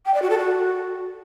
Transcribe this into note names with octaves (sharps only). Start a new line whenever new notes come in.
G5
D5
F#4
A4
F#4